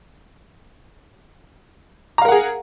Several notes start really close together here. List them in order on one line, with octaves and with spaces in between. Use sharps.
A#5 F5 A#4 F#5 G#4